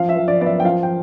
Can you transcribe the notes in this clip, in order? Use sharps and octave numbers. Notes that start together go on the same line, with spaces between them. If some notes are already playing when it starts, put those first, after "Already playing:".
Already playing: F3 F5
E5
F3
D5
B3 D5
E5
G5
F3 F5
G5